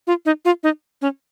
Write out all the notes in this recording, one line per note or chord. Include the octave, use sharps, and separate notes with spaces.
F4
D#4
F4
D#4
C#4